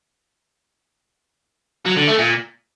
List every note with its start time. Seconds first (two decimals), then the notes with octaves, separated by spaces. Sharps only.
1.86 F#3
1.97 D3
2.08 A3
2.19 A#2